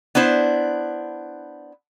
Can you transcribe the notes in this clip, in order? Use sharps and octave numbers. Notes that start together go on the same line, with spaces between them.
B3 D4 E4 C5